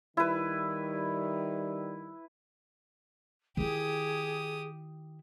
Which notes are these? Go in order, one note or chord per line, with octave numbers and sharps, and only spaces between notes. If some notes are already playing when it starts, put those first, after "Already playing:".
D#3 G3 E4 B4
D#3 E4 G4 G#4 D#6